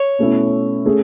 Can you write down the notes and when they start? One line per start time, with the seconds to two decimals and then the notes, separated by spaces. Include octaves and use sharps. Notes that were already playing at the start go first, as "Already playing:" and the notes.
Already playing: C#5
0.19 B2 A3 C#4 E4
0.86 A3 C#4 G#4